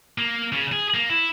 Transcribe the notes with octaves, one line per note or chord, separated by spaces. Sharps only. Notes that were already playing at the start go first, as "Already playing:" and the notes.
A#3
C#3
G#4
A#3
E4